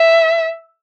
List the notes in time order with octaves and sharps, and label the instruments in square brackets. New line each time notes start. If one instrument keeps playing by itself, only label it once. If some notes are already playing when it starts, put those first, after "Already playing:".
Already playing: [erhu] E5